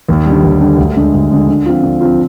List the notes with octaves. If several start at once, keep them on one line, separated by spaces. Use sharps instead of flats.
D#2
G3
D3
D#2
D3 G3
D2
D3 G#3
D2
D3 G#3
D3
F3 C4 F4
D3
F3 C4 F4